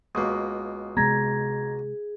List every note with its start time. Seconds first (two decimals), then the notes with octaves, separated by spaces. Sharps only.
0.15 C#2 B2 A#3 D#6
0.97 C3 G#3 B3 G#4 A#5 G#6 A#6